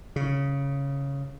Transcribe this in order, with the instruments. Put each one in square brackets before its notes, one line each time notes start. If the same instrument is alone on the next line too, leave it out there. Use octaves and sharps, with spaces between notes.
[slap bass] C#3